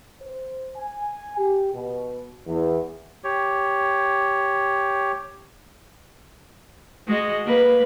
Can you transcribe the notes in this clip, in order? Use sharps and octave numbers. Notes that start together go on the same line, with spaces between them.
C5
G#5
G4
B2
E2
G4 C#5
G#3 F#4 D#5
A#3 B4